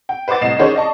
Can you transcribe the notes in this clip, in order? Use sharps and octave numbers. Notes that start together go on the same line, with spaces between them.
G5
B4 C5 F#5 D6 A6
C2 A2 D#5 C7 E7
D#3 C#4 D4 G#4 C5 C#5
D5 D#5 A5 C#6